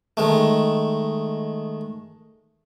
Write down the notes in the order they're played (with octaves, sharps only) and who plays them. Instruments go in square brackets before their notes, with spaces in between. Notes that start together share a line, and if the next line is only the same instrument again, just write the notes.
[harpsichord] D#3 G#3 A3